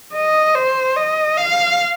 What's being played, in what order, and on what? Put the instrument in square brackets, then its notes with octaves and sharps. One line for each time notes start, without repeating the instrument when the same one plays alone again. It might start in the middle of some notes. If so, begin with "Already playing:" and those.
[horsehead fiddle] D#5
C5
D#5
F5